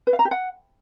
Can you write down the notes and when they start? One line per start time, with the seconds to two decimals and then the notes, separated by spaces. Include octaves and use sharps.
0.07 B4
0.13 F5
0.19 A#5
0.25 G4
0.31 F#5